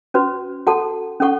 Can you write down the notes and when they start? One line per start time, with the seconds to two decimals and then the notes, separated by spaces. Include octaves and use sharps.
0.14 C#4 F#4 B4
0.67 F#4 A4 F#5 A5
1.20 C#4 A4 F#5 C#6